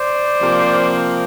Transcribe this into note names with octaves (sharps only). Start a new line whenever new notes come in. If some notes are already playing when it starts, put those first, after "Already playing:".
Already playing: C5 D5
C3 F3 A#3